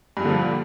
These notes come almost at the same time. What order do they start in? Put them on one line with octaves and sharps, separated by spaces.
G2 A#2 D3 F3